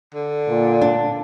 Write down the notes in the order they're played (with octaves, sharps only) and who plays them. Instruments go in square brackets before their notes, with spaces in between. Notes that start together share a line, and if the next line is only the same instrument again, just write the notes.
[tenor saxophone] D3
[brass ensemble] A#2
[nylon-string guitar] D4